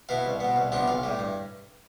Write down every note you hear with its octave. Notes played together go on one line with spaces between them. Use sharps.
B2 B3 E4 F5
C2
B2 B3
C2
C3 F3 B3 D4
B1 F5
A2 G3
G2